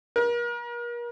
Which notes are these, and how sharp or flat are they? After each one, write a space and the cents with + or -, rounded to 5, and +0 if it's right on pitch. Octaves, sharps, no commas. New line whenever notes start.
A#4 +40